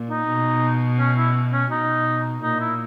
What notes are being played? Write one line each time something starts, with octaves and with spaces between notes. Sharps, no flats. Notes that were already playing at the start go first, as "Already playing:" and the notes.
Already playing: A#2
D#4
B2
C#4
E4
C#4
B2 D#4
A#2 D#4
E4